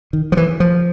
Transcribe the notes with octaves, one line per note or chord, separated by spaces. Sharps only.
D#3
F3
E3
F3